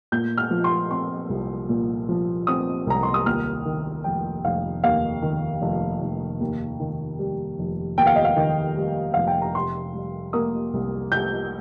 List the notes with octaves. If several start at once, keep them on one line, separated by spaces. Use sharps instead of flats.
A#2 G6
F6
F3
C6
C4 C6
C2
A#2
F3
C4 D#6
C2 A#5
C6
D#6
D#2 F6
D#3
F1 G5
F1 F5
D#2 F5
D#3
F1
F1
D#2
D#3
G3
F1
D#2 G5
F5
D#5
F5
D#3
G3
F1 F5
G5
A#5
C3 C6
G3
A#3 D#6
C2
C3 G6